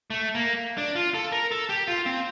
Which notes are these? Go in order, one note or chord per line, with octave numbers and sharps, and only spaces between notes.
A3
A#3
D4
F4
A4
A#4
A4
G4
F4
C4